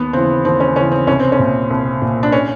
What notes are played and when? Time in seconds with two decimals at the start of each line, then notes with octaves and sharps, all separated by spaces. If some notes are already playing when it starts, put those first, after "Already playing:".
Already playing: D#2 B3
0.13 C#3 E3 C4
0.44 D#2 C4
0.60 C#4
0.76 C#3 E3 C#4
0.92 C4
1.07 C2 C#4
1.20 C4
1.32 C#4
1.39 A#2
1.70 C2
2.02 A#2
2.23 D4
2.32 C#4